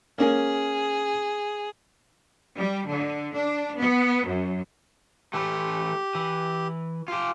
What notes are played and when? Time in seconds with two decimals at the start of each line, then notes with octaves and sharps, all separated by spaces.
0.18 A#3 C#4 G#4 A#4
2.56 G3
2.86 D3
3.33 D4
3.77 B3
4.25 F#2
5.34 E3 A3 G4
6.15 E3
7.08 F4 G4